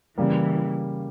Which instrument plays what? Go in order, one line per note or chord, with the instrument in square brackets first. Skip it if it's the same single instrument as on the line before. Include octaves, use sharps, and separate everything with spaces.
[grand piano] C#3 G3 A#3 [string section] E3